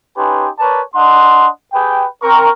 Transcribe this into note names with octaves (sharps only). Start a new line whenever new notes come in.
C#4 D#4 G4 B4 G#5 C6
A#4 B4 C#5 D5 A5
D4 D#5 F#5 C6
G4 G#4 B4 G5
C4 A#4 C#6